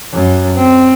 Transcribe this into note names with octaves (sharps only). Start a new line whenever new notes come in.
F#2
C4